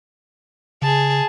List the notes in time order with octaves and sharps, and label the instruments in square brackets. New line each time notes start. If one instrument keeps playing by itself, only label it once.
[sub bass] C#3 [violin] G#4 A5